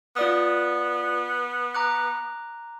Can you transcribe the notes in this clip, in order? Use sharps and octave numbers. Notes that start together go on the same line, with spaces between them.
B3 F4 D5 D#6
A#5 D6 F#6